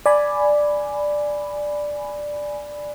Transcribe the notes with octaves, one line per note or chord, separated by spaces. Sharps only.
D5 G#5 B5